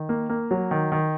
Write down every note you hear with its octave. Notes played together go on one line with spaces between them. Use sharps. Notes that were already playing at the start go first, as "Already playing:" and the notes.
Already playing: D#3
A#3
A#3
F#3
D#3
D#3